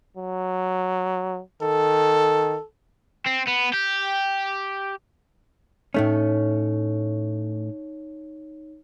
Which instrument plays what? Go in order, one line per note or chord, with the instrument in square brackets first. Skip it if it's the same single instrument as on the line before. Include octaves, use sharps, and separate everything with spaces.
[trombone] F#3
[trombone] D#3 [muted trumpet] A4
[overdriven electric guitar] C4
B3
G4
[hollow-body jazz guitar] A2 A3 C#4 [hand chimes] D#4 C#5